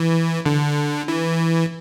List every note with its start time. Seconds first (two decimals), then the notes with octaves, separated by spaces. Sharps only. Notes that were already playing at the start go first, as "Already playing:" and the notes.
Already playing: E3
0.46 D3
1.08 E3